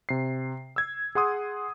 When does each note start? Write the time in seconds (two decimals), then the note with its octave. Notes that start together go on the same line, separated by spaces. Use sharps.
0.09 C3 C7
0.76 E6 G#6
1.15 G#4 F#5 C6 D#6